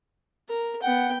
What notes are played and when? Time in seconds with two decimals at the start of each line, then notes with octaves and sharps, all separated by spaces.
0.48 A#4
0.82 B3 F#5 G5